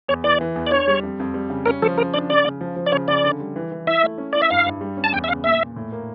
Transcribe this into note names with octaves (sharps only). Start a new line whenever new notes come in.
E2 C#5
E3 D5
E3
E2
D5
D4 C#5
G3
F2
F2
G3
C#3
C#4 A#4
F3 A4
C#3 A#4
D4 D5
C#3 D5
C#3
F3
F3
D5
C#3 C#5
C#3 D5
D3
G3
E3
E3
E4 E5
A3
C#4
E4 D5
E5
G2 F5
G2
G3
C#4
A5
E2 G5
E5
C#3 F5
A#2 E5
A#2
A2
A#3